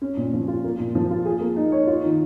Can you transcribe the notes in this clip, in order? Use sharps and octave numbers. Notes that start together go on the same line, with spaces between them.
C#4
A#2
F3
F4
A#3
A#2
F3
F4
G#4
A#3
D#4
C#5
F4
D#3